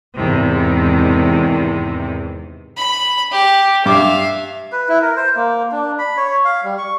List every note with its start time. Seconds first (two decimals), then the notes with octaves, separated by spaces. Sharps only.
0.17 E2 G#2 C3 D#3
2.77 B5
3.31 G4
3.86 G2 E5 F5 D6
4.72 B4
4.89 E4
5.02 A#4
5.16 C5
5.36 A#3
5.72 D4
5.99 B5
6.17 C#5
6.45 F5
6.64 G3
6.78 C#6